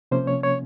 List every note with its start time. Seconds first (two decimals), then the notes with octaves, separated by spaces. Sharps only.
0.11 C3 F3 A#3 C#4 C5
0.27 C#5
0.43 C#5